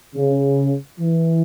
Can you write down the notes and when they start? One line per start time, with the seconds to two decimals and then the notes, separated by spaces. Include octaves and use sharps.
0.16 C#3
1.00 E3